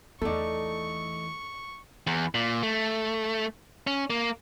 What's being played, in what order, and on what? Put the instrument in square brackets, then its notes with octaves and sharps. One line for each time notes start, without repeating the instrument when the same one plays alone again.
[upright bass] E2 E3 [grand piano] A3 D#4 [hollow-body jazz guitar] A4 D5 [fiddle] C#6
[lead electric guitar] E2
A#2
A3
C#4
A#3